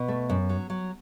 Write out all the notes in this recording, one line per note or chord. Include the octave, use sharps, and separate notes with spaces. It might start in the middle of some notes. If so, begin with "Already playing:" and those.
Already playing: B2
A3
F#2
F#3
F#3